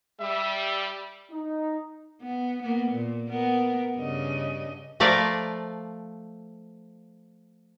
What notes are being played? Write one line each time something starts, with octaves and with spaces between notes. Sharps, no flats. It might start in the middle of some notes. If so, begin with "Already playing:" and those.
G3 E5
D#4
B3
A#3 B3
A#2
B3 A#4
G2 C#3 D#5
F3 A3 A#4 D5 F5